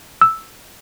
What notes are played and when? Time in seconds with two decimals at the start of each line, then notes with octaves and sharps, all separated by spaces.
0.21 E6